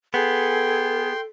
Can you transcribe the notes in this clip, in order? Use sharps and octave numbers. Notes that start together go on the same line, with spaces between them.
B3 G#4 A4 G5 C6